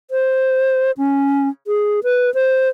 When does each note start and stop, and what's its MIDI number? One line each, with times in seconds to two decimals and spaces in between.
0.11 0.91 72
0.98 1.49 61
1.67 2.00 68
2.04 2.33 71
2.34 2.69 72